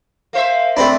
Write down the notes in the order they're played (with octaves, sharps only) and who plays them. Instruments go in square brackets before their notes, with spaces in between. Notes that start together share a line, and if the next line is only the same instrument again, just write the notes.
[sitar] A#3 C5 E5 [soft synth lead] F5
[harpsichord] A3 C4 D4 [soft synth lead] B5